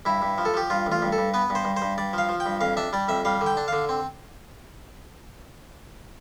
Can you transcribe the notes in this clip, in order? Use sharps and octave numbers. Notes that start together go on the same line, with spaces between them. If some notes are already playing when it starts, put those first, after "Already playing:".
G2 E4
G2
F3
A4
F3 G4
G2 F4
A1
F4
G2
A4
G2
B3 B4
G2
C5
G2
C5
G2
G2 D5
F3 F5
F3
G5
G2
F2 F5
D4 E5
G3 D5
F2 E5
G3 F5
D3
G5
D4
D3 F5
C4